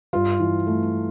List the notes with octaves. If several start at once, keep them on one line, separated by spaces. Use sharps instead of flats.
G2 F4
E3
A3